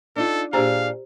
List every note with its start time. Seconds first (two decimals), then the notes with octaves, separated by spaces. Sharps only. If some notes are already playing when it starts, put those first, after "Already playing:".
0.16 D4 D#4 F4 A4
0.53 A#2 D4 G4 G#4 C5 F5 A#5